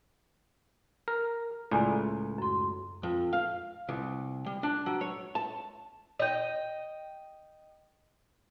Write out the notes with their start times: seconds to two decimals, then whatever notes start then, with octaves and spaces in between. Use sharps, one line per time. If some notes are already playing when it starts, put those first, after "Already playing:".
1.08 A#4
1.71 C#2 A2 D5 G#5 A#5
2.38 F#2 C6
3.03 F2
3.33 F5
3.88 C2
4.46 G3
4.63 D4
4.86 F#3
5.01 C#5
5.35 A5
6.20 D#5 G5